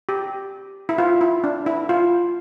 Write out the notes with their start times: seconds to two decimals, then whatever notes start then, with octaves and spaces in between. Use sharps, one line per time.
0.09 G4
0.89 E4
0.98 F4
1.21 E4
1.44 D4
1.66 E4
1.89 F4